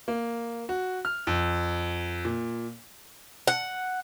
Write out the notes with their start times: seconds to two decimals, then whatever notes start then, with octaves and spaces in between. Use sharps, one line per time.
0.08 A#3
0.69 F#4
1.05 F6
1.27 F2
2.25 A#2
3.48 F#5